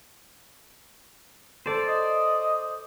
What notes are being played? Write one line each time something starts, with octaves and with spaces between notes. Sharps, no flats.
A4 C5 D5
D#5